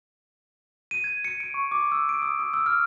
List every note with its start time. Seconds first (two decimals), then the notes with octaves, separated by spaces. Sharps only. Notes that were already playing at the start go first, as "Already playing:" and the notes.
0.91 D#7
1.04 G#6
1.25 C#7
1.40 D7
1.54 C#6
1.71 D6
1.92 E6
2.09 D7
2.22 D#6
2.39 D#6
2.54 E6
2.66 F6